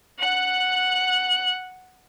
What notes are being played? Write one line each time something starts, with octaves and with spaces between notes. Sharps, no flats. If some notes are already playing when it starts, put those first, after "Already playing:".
F#5 F#6